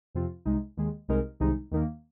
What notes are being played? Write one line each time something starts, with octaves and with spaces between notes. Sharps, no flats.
F2 C3 F3 C4 F4
C2 C3 G#3 D#4
D#2 D#3 G#3
C2 C3 G#3 D#4 A#4
C2 C3 D#3 G#3 D#4
D#2 D#3 A#3